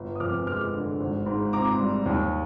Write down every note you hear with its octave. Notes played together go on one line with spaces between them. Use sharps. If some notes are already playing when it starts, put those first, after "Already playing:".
Already playing: G1
D#6
F2 D6 F6
G#3 D6 F6
D3
G#1
G#2
C4 A#5 D6
G3
D#2